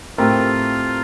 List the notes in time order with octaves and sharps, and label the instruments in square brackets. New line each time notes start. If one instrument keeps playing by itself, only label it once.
[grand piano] A2 A3 C4 G4 A#4 [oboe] F4